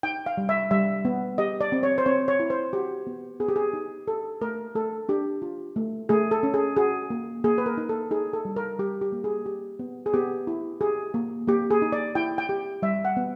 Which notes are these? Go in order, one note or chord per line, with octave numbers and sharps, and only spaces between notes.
D#4 G5
F5
G3
E5
G3 E5
B3
G4 D#5
D5
C4
C#5
C5
C4 C#5
C#5
E4
C5
F#4 G4
B3
B3 G#4
G4
G#4
D#4
G4 A4
A3 A#4
A3 A4
D4 G4
F4
A3
A3 G#4
A4
C#4
G#4
F#4 G#4
A#3
A#3 G#4
B4
A#4
D#4
A4
D#4 G#4
A4
G3
A#4
G3 G4
G4
A#3
G#4
G4
B3
G#4
B3 G4
E4
G4 G#4
A#3
A#3 G4
G#4
D#4
D5
E4 G5
G5
G4
G3 E5
F#5
B3